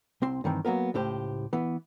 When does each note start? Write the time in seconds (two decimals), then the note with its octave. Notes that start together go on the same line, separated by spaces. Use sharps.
0.22 C2 C4 C6
0.44 G2 D#3 E3 C4
0.65 F#3 A#3 B3 A#4
0.94 C#2 A2 G4 C5
1.53 E3 B3